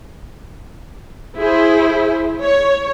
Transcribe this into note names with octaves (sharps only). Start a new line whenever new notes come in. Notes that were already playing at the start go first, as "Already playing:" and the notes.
E4 G#4 C5
C#5